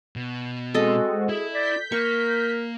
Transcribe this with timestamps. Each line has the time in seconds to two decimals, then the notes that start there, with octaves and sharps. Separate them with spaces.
0.16 B2
0.74 G#3 C4 F#4 A4 D#5
1.29 E4 G#4 E5
1.54 D5 G6 B6
1.92 A#3 A#4 C#6